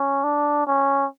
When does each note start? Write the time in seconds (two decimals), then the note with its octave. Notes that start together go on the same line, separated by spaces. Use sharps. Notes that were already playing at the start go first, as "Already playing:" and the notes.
Already playing: C#4
0.24 D4
0.67 C#4